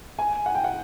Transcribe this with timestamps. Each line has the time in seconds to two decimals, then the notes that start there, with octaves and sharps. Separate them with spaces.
0.19 G#5
0.46 F#5
0.55 G5
0.64 F#5